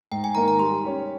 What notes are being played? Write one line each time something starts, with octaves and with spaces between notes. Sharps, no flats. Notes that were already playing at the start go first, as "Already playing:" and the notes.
G#2 G5
G#5
D#3 A#3 D#4 A#5
A#5
G3 C6
C#4 G4